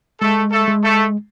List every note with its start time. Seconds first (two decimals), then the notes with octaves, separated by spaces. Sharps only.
0.21 G#3 A3 A4
0.52 A3 A4
0.68 G#3
0.83 A3 A4